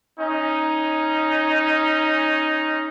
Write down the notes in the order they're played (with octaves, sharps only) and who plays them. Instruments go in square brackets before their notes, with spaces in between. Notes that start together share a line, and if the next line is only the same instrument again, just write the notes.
[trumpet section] C#4 D#4